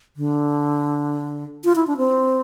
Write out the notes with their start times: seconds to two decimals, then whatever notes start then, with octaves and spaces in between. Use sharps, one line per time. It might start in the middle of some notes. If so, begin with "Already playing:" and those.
0.16 D3
1.64 F4
1.76 E4
1.87 D4
1.97 C4